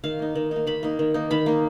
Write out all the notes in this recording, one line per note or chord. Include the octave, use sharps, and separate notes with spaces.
D#3 F5
A#3 D#4
D#3
A#3 D#4
D#3 B5
A#3 D#4
D#3
A#3 D#4
D#3 B5
A#3 D#4